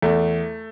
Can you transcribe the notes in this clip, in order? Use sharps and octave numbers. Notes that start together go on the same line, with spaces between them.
E2 A3